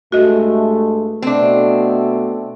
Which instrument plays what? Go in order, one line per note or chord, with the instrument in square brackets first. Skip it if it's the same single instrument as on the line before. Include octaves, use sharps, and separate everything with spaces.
[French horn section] G2 G#3 A3 [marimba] F#4 D#5
[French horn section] B2 A3 [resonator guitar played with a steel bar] C4 D4